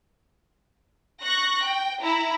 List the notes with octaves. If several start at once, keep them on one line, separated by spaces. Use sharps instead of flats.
C#6 F#6 A#6
G5
E4 A#5